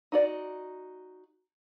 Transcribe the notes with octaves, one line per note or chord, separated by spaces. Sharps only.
D#4 F#4 D5